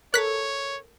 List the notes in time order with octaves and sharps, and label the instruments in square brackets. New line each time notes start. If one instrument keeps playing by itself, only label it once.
[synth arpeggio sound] A4 A#4 [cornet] C#5 [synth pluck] F#6 B6